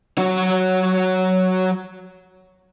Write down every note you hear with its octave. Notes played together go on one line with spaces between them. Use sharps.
F#3 F#4